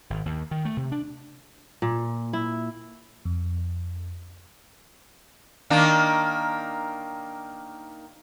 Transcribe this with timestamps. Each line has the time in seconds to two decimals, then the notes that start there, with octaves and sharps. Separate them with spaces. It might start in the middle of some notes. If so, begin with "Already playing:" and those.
0.10 G#1
0.26 D#2
0.51 D#3
0.65 A3
0.77 C3
0.92 D4
1.82 A#2
2.33 E4
3.25 F2
5.70 D#3 A#3 D4